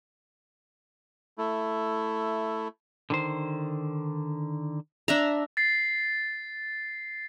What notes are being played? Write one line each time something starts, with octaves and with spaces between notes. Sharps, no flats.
A3 E4
D3 D#3 C5
D4 E5 A#5
A6 C7